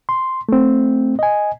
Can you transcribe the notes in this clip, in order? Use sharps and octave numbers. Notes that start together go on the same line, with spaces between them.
C6
A3 C4
D#5 G#5